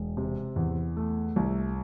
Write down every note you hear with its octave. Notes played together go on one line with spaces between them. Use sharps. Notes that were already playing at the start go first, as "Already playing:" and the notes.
Already playing: E1
C3
E2
A3
C2